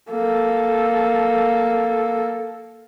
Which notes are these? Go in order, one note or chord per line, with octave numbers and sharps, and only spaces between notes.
A#3 A4